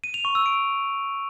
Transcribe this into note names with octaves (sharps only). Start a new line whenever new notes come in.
D#7
F7
C#6
E6
D7